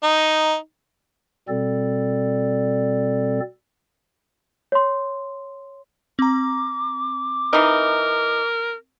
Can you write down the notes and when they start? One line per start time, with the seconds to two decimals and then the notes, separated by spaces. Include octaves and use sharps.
0.03 D#4
1.48 B2 G3 C4 A4 D5
4.72 C#5 C6
6.19 C4 A#5 D6
7.53 E3 D#4 A#4